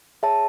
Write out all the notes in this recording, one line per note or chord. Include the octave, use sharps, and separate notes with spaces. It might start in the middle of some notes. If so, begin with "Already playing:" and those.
G#4 C#5 E5 A5